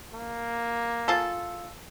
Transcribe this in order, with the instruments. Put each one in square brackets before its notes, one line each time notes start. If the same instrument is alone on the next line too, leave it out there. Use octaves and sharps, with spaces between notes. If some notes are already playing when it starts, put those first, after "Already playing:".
[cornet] A#3
[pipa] F4 G#4 A4